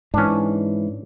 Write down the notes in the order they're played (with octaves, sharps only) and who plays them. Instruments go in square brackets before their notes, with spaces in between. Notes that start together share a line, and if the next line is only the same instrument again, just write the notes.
[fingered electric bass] G#2 E3 [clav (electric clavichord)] C#4 D4